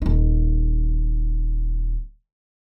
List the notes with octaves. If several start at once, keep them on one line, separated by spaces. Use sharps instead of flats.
D#1 D#4